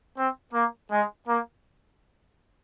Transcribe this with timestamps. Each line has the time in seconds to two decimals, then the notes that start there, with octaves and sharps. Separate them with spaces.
0.17 C4
0.54 A#3
0.90 G#3
1.27 A#3